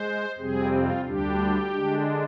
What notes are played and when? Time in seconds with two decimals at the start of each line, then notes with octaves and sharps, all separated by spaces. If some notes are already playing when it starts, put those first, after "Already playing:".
Already playing: G#3 C5
0.38 F2 C3 G3 C4 G#4
0.71 F4
1.05 D2 D3 G3 D4 G4
1.71 D3 G#3 D4